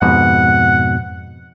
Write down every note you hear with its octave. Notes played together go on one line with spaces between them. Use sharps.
F2 G#2 B2 F#5